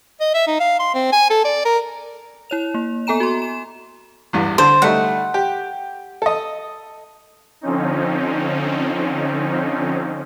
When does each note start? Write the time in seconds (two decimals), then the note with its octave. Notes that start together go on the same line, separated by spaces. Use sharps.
0.20 D#5
0.34 E5
0.47 D#4
0.60 F5
0.79 C6
0.94 C4
1.12 G#5
1.30 A4
1.44 D5
1.65 A#4
2.50 E4 C#5 F7
2.74 A#3
3.07 B3 A4 G#5 A#5 E7
3.20 F#4 C6
3.42 E7
4.33 A1 E2 G2
4.58 D3 C5
4.82 G3 A3 D#4 F#5
5.34 G4
6.22 A4 D#5
7.61 D3 F3 C4 C#4 D#4